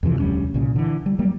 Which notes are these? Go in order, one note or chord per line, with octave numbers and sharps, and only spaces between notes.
F2 C3 E3 F3
E1 D2 G3 C#4
C2 A#2 C#3
D3 E3
G3
F#3 G3 A#3